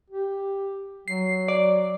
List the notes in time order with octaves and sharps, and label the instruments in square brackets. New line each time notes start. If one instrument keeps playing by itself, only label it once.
[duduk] G4
[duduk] F#3 [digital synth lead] C7
[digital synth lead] D5